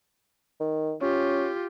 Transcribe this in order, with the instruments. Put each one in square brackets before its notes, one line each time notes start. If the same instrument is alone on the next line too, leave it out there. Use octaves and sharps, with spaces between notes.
[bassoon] D#3
[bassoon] C#4 [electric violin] F4 G4